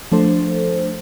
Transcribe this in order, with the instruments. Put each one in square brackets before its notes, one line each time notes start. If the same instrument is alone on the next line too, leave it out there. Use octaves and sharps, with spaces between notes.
[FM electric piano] F3 A3 D4 A4 C5